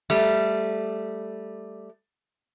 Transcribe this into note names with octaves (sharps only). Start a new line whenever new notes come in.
G3 A3